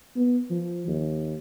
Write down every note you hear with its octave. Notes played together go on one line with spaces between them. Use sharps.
B3
F3
D#2